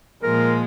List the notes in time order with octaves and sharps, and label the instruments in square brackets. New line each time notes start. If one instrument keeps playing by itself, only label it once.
[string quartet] A#2 F3 G#3 [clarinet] A#4